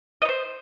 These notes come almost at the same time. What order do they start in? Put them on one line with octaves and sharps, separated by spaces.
D#5 C#5 C5